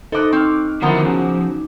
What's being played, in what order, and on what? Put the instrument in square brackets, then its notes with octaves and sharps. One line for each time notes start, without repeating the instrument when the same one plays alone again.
[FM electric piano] D#4 D6 [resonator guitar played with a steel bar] A4 D#5 [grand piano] C5 F#6
[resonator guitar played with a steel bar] C4 [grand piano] C#6 F6
[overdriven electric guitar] D3 C6 [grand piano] D#3 F3 E4 [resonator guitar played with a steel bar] F#3 B3 A#5
[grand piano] C#3 F#4 G#4 [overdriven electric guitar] F3